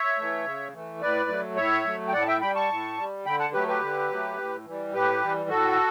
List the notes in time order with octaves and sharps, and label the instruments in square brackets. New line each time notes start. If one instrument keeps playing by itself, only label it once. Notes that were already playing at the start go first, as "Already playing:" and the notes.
Already playing: [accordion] C#5 E5
E3 A3
C#3
E3 A3
A2 B4 D5
F#3 A3
A2 C#5 E5
F#3 A3
G5
A2 D5 F#5
A5
E5 G5
G3 G5 B5
A5 C#6
A2
G3
D3 G5 B5
F#5 A5
F#3 A3 G4 B4
G4 B4
D3
F#3 A3
A2
E3 G3
A2 G4 B4
E3 G3
A2 F#4 A4